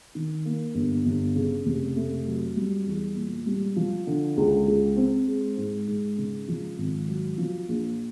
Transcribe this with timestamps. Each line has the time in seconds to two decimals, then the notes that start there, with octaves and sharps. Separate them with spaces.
0.15 D#3
0.45 A#3
0.75 G1
1.05 G1
1.36 C#3
1.65 F1
1.96 A3
2.26 F#3
2.57 G3
2.86 E2
3.16 A#2
3.46 G3
3.76 F3
4.07 D3
4.37 C#2
4.67 C#2
4.97 C4
5.28 G#3
5.57 G#2
5.88 G#2
6.18 C#3
6.48 F3
6.78 G#1
7.08 F#3
7.38 F3
7.69 A#1